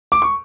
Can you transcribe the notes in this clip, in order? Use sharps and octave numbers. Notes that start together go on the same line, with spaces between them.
D6
C#6